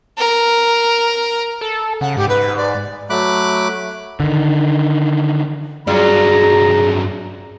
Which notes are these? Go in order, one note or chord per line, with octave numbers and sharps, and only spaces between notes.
A#4
A4
C#3 F#5
G#2 G4
G#2 B4
D5
F#3 A3 B5 D6 F#6
D3 D#3
G2 F#3 F4 G#4 D5 A#5